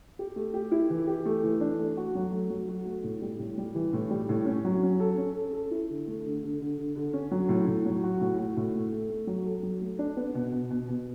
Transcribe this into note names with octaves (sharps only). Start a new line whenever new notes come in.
G4
A3
G4
E4
E3
G4
A3
E3
D4
A3
F#4
F#3
A3
F#3
F#4
A3
A2
G3
A2
G3
E3
A2
G3
A2
C#4
F#3
C#4
A4
C#4
A4
A4
E4
D3
A3
D3
D3
D3
D3
D3
C#4
F#3
A2
A2
F#3
F#4
A2
F#4
A2
A3
A3
A3
F#3
A4
F#3
A3
D4
B3
B2
B2
B2
B2